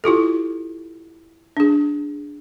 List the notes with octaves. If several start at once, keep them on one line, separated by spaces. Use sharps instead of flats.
E4 F4 G4 A4
D4 G#4